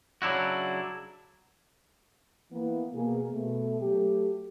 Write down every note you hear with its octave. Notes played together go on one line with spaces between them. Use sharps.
C#3 F#3 D4 E4 F#4
E3 A#3 B3
B2 A#3 G#4
B2 A3
F#3 A3 G4